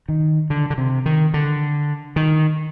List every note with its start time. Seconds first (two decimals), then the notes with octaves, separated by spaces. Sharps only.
0.09 D#3
0.50 D3
0.70 D3
0.78 C3
1.06 D#3
1.34 D3
2.16 D#3